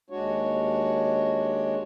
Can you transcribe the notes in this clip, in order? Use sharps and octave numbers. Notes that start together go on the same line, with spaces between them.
D#2 G#3 D4 F#4 C#5